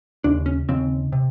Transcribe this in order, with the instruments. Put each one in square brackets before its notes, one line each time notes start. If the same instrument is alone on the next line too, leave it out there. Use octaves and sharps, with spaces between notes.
[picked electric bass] D#2 C#3 D4
C#4
D#2 C#3 C4
C3